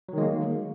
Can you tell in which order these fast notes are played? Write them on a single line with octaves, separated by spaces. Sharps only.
F#3 D#3 G#3 A#3